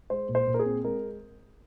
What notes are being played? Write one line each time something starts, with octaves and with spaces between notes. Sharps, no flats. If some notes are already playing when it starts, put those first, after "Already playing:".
G#3 C5
A#2
C5
A#2
A#4
G#4
C4
G#3 A#4